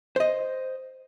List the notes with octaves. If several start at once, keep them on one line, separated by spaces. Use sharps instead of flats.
C5 D#5